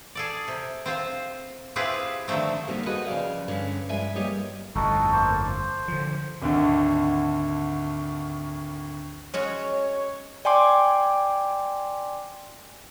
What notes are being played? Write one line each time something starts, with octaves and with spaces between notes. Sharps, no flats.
G#4 A4 D5
C3
C4 F4 C5
C4 E4 F4 G4 G#4 B4
D3 D#3 F3 A3 C4
D3 D#3 G3 A3 A#3 C4
F#4 G#4 A4 B4 C5 D#5
C#3 F3 D5 F5
G2 D3 C#4
G2 F3 G#3 D5 E5 G#5
G3 A#3 G4 C#5 D#5
G1 F2 A2 D#4 F#4 A4
A#3 C5 A5
C5
D3 F3
G#1 D2 D3
G#3 C#4 F#4 C#5
D5 G5 G#5 C6 D6